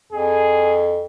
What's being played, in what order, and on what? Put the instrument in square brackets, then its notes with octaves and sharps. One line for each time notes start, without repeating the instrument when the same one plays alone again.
[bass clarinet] F2 [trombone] G#4